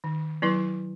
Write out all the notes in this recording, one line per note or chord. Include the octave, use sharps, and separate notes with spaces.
D#3
F#3 B3 E4 B4